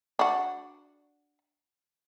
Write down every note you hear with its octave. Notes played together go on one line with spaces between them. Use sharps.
D4 F#4